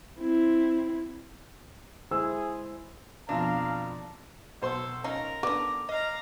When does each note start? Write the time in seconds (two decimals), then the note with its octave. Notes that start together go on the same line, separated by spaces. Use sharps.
0.19 C4 E4
2.11 G#3 E4 G#4 C5 E6
3.29 F2 B2 F3 D4 F5 A#5
4.62 B1 A4 C5 C6
5.04 C#4 D#4 F4 A#4 A#5
5.43 D3 B3 D5 D6
5.89 D#5 F5 A#5